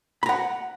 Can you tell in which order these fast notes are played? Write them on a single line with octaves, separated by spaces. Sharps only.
B5 A#5 F#5